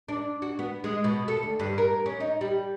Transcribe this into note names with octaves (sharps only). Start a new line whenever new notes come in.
D4
F#4
B3
G#3
B2
A4
D2
G2
A#4
C#4
D#4
G3